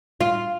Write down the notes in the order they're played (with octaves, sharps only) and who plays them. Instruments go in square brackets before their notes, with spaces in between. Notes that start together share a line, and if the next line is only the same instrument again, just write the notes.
[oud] F4